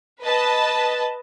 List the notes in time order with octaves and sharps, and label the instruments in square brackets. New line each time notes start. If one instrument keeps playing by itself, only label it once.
[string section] B4 D#5 A5